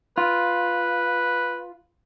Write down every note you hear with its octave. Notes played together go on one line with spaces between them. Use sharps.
F4 B4